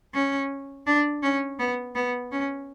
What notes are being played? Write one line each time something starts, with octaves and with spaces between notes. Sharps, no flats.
C#4
D4
C#4
B3
B3
C#4